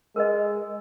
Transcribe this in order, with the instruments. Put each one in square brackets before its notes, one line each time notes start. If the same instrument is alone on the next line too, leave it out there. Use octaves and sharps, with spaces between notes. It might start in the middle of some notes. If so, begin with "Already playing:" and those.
[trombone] G#3 [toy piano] A#4 B4 D#5